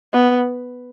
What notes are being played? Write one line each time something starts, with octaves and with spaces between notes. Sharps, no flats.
B3